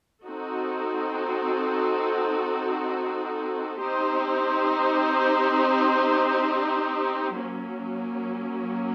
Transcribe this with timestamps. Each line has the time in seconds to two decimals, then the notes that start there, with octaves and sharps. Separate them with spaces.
0.24 C4 D#4 F#4 A4
3.78 C4 D#4 G4 C5
7.33 F#3 A#3 C#4